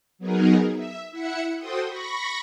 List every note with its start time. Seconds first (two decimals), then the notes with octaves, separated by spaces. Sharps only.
0.19 F#3 B3 D#4 G#4 A#4
0.74 E5
1.11 E4 E5 F#5 C#7
1.57 F#4 A4 C5 G5 C6 D#6
1.86 B5 C#6 A#6